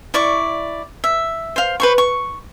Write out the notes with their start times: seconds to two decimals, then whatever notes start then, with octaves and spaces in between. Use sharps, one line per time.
0.14 E4 D5 C#6
1.04 E5
1.56 C5 F5
1.80 B4 C5 C#6
1.98 C#6